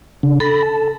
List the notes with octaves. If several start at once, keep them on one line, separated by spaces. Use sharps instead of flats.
C#3 D4
A4 B5 A#6
A5